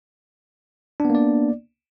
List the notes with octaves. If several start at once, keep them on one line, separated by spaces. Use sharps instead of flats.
A#3 B3 D4 D5